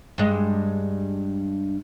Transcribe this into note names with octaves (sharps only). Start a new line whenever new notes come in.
G2 G#3